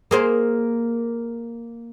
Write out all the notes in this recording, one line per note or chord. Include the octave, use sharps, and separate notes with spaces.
A#3 G#4 C5